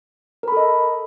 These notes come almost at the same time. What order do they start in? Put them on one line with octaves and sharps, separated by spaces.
A#4 B5 A4 D#5